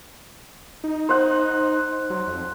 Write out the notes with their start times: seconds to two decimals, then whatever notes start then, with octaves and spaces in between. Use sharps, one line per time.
0.84 D#4
1.09 C5 F#5
2.10 F#3
2.27 F2